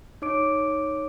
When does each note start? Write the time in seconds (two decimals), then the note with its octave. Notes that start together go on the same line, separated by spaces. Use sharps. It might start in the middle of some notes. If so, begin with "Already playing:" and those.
0.22 D#4 C#5 D6 D7